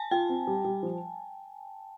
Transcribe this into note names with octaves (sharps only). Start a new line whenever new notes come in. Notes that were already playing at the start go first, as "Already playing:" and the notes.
Already playing: G#5 A5
F4 G5
C4
G3
G3
F3